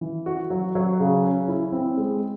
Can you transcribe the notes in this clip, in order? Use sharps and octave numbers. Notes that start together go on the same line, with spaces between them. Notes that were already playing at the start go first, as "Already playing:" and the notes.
E3
F#4
F#3
F#3
C#3
C#4
E4
C4
G#3